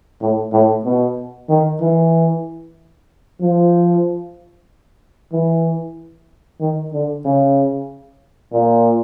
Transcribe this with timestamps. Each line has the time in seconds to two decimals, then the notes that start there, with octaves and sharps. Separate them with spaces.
0.21 A2
0.53 A2
0.85 B2
1.49 D#3
1.81 E3
3.41 F3
5.32 E3
6.60 D#3
6.93 D3
7.25 C#3
8.53 A#2